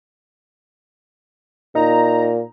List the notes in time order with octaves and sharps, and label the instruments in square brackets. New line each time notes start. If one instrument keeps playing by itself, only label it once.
[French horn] A#2 [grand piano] D#4 [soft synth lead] A#5